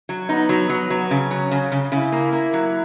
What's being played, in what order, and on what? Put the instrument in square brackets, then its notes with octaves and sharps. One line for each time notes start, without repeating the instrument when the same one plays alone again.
[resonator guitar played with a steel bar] F#3
[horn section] B3 [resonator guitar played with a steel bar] D#4
[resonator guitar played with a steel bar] F#3
F#3
F#3
[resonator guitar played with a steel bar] C#3 [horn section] C#4
[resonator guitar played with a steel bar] F#3
C#3
C#3
[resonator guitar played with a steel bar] C#3 [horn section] E4
[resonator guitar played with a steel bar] A#3
A#3
F#3